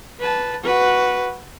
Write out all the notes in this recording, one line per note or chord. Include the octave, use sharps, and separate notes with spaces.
B4 A5
F#4 B4